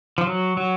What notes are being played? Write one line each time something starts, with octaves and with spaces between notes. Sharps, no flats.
F3
F#3
F#3